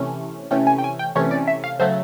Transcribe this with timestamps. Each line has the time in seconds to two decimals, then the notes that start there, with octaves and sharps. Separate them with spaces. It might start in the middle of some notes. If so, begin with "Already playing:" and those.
Already playing: C3 E3 A3 C#4
0.51 C3 E3 A3 C#4 G5
0.67 G#5
0.78 G5
0.84 G#5
0.99 G5
1.15 C3 E3 A3 C#4 C#5
1.31 D5
1.48 E5
1.64 F5
1.80 C#3 F#3 A3 C5